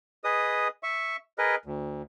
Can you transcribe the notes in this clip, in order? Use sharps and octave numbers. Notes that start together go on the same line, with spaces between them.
G#4 B4 D#5 D#6
E5 C#6
G#4 A#4 B4 D#5
D2